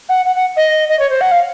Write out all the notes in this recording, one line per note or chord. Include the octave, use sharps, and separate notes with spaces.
F#5
F#5
F#5
D#5
D#5
C#5
C5
F#5
F5